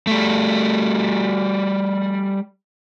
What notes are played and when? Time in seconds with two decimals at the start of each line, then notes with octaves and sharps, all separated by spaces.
0.07 G3 A3